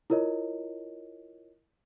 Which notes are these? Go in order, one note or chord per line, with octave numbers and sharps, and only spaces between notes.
E4 F4 A#4 C#5 D#5